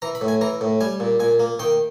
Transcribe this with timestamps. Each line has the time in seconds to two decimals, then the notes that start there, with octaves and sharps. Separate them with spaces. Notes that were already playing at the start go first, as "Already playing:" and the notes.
0.02 E3 A#5
0.15 B5
0.21 A2
0.28 G#5
0.41 E3 A#5
0.61 A2
0.81 G3 G#5
1.00 A#2
1.20 A#2 G#5
1.40 A#3
1.59 D#3 G5